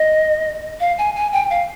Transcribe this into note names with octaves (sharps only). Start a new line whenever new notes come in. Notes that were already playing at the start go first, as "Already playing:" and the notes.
Already playing: D#5
F5
G#5
G#5
G5
F5